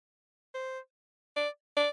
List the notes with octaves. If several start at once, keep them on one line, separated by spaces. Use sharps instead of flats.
C5
D5
D5